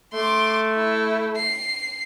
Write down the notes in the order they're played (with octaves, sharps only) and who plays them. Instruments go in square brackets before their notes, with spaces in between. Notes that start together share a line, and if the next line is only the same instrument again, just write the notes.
[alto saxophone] A3 [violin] C6 D6
[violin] E4
C7